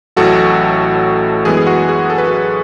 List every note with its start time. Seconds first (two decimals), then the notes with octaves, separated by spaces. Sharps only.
0.16 A1 A2 F#3 F#4 A4
1.45 F#2 E3 G#3 B3 G#4
1.57 G#4
1.67 F#4
1.89 G#4
2.10 A4
2.18 B4
2.28 F#4 A4